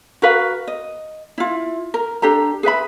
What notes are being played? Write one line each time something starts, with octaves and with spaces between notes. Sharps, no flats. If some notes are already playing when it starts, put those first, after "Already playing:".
F#4 A#4 B4 F5
D#5
E4 F4
A#4
D4 G4 A4 A#5
G#4 B4 E5 B5